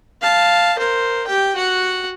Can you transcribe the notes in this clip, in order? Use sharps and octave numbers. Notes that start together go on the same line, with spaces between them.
F5 A5
A#4 C5
G4 G5
F#4 F#5